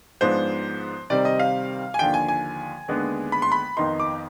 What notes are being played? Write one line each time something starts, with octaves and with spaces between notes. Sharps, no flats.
G#2 F3 G#3 B3 D4 C5
C3 D#3 G3 C4 D#4 D5
D#5
F5
G#5
D#2 D3 F3 G5
G#5
G#5
D#2 D3 G#3 B3 D4
B5
C6
B5
F2 D#3 B3 D#4 C6
D6